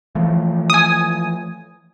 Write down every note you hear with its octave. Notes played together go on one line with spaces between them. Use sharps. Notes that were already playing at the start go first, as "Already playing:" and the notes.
E3 F3 A3
G#5 D#6